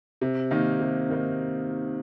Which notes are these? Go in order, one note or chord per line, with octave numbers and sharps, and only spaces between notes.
C3
D#3 A#3 D#4
C3
D#3 A#3 D#4